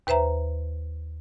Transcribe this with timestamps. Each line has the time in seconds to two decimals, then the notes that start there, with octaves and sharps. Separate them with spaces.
0.07 D#2 B4 C5 E5 A#5